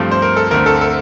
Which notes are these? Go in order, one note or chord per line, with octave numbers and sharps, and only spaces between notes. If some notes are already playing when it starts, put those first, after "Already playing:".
Already playing: G2 F3 A3 C4
C5
A#4
A4
D2 D3 A3 C4 A#4
A4
A4